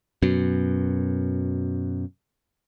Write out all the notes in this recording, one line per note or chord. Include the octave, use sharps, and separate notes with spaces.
F#2 B2